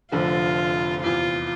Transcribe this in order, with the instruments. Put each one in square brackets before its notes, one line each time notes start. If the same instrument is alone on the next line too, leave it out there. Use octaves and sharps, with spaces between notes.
[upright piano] F1 F2 D3 F3 C4 [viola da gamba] F4
[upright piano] E2 C3 E3 [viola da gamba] F4